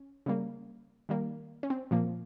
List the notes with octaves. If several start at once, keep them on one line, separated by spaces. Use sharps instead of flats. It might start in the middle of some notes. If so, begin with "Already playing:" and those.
Already playing: C#4
C#3 G3 A#3
D#3 G3 A#3
C#4
C4
A#2 F3 A#3